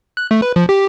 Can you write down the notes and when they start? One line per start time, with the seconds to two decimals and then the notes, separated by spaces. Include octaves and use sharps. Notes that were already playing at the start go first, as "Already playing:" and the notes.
0.17 F#6
0.31 A3
0.42 B4
0.56 F3
0.69 G4